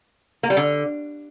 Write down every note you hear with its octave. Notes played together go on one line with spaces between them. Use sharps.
A#3
G3
D3